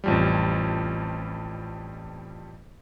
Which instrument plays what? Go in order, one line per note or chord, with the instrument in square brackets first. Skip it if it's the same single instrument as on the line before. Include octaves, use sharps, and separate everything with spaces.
[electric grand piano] A1 F2 G3